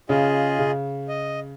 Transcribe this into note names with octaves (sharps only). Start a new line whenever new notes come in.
C#3 F4 G#4 D#5
C#3
D#5